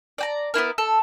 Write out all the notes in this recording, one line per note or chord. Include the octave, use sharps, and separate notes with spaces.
D5 G5 A#5
B3 D4 E4 A#4
A4